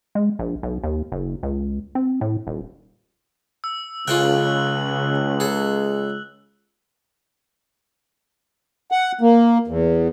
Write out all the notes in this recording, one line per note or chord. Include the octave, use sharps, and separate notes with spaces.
G#3
A#1
B1
D#2
F#1
C#2
C4
A2
D#1
E6
C#2 C#3 F4 A4 G5 F#6 F#7
G#4 A4
F#5
A#3
E2